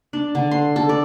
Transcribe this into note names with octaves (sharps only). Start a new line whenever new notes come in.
D4
D3
C6
A4
D5